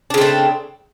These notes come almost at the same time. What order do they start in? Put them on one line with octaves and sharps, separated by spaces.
D4 C#3 C4 A3